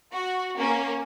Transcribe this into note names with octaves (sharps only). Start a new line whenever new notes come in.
F#4
A#3 C#4